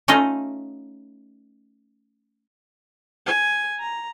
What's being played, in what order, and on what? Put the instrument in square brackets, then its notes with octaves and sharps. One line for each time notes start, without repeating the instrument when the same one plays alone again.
[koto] A3 C#4 D#4 F4 D#5
[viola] G#5
A#5